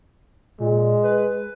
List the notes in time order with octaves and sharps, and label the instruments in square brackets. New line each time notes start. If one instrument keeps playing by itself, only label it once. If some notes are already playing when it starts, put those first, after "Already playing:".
[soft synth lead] A#2 [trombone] G#3
[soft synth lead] B4